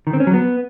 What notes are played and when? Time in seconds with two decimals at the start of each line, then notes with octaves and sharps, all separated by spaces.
0.07 D#3
0.13 C4
0.20 C#4
0.27 F#3
0.34 B3